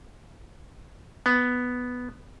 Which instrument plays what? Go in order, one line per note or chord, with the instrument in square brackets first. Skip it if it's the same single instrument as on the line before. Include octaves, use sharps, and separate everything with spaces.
[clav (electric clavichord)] B3